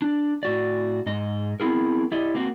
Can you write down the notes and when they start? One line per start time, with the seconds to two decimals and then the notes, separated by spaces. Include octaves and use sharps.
0.02 D4
0.43 A2 F#4 D5
1.06 G#2 D#5
1.60 B3 C4 E4 G#4 A#4
2.12 E4 G4 D5 D#5
2.35 A#3 C4 F#4